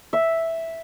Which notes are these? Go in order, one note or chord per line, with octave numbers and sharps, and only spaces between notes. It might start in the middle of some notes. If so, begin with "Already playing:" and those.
E5